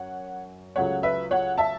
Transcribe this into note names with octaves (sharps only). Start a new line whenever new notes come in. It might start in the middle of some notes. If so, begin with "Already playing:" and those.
Already playing: F#2 C#5 F#5
C#2 C#3 F#3 A3 C#5 F#5
B4 E5
C#5 F#5
E5 A5